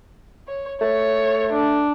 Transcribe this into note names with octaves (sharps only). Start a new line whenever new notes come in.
C#5
A3 C#5
D4